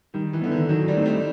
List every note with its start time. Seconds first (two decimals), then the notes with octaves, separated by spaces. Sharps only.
0.14 D#3 G3
0.33 E3
0.42 D3 B3
0.46 E4
0.52 D#3
0.69 D#3 F#3
0.88 G3
0.97 A3 C4 D#4
1.06 G3